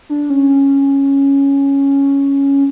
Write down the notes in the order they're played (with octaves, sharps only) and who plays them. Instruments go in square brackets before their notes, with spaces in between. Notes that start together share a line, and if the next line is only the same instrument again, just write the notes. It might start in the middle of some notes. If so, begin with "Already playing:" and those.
[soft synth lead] D4
C#4